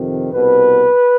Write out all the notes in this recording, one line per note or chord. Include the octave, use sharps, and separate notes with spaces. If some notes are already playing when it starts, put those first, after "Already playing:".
Already playing: F2 C3 D#3
C2 B2 B4